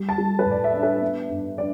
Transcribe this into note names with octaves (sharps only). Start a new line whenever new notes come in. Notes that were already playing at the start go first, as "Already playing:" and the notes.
Already playing: G3
A5
G3
B4
A2
D5
E5
D4
B4
B3
G2
D4 D5